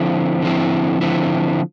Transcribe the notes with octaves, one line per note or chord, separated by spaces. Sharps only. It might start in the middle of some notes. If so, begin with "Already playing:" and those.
Already playing: D3 F3 C4 E4
D3 F3 C4 E4
D3 F3 C4 E4